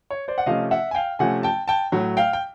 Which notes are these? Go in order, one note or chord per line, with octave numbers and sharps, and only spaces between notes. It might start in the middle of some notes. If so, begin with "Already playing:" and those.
C#5
C5 D5
F#5
C3 F3 A3 C#4 D#5 F5
E5 F#5
G#5
F5 G5
C3 F3 A3 C#4 F#5 G#5
G5 A5
G5 A5
A2 F#3 A3
F5 G5
G5